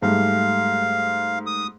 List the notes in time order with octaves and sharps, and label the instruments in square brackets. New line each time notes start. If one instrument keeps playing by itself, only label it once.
[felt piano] G#2 G3 A3 [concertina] F5
[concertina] D#6